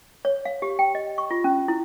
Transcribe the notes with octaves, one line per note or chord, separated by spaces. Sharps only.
C#5
F5
G4
G5
D#5
C#6
F4
C#4
E4